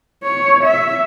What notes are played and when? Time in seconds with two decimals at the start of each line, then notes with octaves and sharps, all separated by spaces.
0.24 C#5
0.64 E5